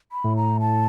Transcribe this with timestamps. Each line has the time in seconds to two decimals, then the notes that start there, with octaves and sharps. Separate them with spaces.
0.12 B5
0.24 A2
0.37 A#5
0.60 A5